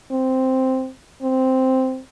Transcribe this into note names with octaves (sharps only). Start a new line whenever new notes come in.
C4
C4